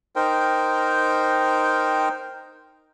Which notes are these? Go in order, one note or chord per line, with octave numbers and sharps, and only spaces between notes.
D#4 A#4 C5 G5